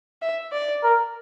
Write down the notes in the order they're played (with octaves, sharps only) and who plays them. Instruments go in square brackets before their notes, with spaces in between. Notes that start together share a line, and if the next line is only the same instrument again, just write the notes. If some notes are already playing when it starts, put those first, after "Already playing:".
[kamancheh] E5
D5
[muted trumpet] A#4